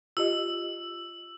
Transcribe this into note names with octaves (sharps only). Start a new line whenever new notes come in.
F4 G4 D#5 E6